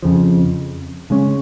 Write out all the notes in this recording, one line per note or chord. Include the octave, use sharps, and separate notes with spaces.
F2 C#3 F3
C#3 G#3 C#4